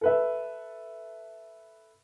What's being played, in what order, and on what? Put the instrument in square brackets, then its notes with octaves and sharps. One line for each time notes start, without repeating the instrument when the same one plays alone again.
[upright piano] A4 B4 E5